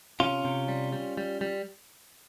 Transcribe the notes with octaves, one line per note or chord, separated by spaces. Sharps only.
C3 C#4 F4
C3
G3
G3
G3
G3